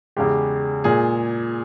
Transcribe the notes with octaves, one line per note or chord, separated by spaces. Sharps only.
E2 C#3 G#3 G4
A#2 G#3 G#4